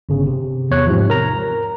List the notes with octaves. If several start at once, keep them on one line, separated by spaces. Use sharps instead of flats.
G1 C#3
C3
E2 C#5 F#6
G#2 C3 F3
A#4 A#5